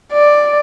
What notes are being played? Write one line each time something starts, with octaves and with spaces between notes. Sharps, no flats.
D5